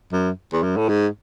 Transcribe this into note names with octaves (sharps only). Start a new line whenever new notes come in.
F#2
E2
F#2
A2
G#2